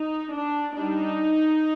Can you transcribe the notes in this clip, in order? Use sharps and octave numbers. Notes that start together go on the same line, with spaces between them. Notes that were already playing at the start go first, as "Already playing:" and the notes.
Already playing: D#4
D4
G3 D4 D#4